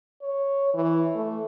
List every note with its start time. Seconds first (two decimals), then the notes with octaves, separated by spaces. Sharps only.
0.22 C#5
0.74 E3
1.15 A3